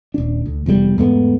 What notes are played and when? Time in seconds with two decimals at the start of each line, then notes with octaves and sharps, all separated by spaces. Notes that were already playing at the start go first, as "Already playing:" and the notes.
0.14 D#1 D4
0.46 D2
0.66 F1 E2 A#2 G3
0.98 E2 G#2 A3 B3